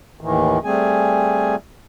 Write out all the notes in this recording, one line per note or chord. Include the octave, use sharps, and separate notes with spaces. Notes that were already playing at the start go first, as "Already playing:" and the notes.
D#2 A2 D#3 E3
G3 A3 C4 G#4 G#5